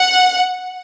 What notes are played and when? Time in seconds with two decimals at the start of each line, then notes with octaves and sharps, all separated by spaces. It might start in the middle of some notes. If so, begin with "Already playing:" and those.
Already playing: F#5